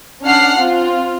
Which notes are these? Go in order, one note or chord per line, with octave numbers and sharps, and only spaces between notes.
C#4 D4 F#5 F6 C7
C4 F4